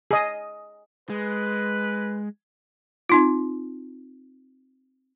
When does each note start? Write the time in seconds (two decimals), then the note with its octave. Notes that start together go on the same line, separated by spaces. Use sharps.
0.11 G#4 D#5
1.10 G#3 B4
3.09 C4 D#4 F4